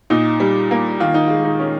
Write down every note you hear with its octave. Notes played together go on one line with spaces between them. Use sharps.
A#2 D#4
G3
A#3
D#3 F4
D#4
G#3 F4
D#4
C#4